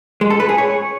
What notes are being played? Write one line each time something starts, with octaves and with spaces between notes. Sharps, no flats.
G#3
A4
B4
G#4
C#5